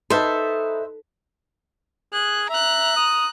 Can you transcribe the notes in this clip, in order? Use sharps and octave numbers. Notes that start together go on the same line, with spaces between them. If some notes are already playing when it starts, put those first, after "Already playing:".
D#4 A4 B4 C5 E5 A5
G#4 F#6
E5 A#5 F#6
D#6